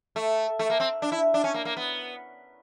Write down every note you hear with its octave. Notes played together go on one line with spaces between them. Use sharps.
A3
A3
A#3
C4
D4
E4
D4
C#4
A#3
A#3
B3